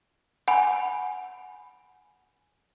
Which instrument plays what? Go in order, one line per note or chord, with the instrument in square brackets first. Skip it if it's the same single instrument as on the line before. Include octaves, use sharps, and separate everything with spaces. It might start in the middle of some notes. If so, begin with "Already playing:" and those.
[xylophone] F#5 G#5 B5